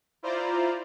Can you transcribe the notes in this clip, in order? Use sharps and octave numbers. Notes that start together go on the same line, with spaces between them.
E4 F4 C5 D5 A#5